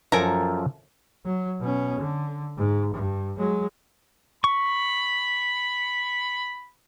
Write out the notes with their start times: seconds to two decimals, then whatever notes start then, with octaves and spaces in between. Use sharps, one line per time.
0.12 F#2 F3 A4 A#4 G#5 A#5
1.26 F#3
1.60 B2 C#4
2.00 D3
2.58 G#2
2.94 G2
3.38 F#3 G#3
4.44 B5 C#6